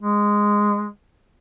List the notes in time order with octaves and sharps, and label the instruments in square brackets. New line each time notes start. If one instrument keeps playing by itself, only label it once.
[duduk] G#3